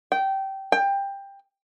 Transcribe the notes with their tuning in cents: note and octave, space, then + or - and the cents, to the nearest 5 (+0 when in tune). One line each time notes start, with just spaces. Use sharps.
G5 -20
G5 +15